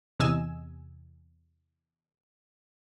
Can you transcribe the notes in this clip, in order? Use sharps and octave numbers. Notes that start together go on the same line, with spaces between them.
E2 C3 D#5 G#5 E6 E7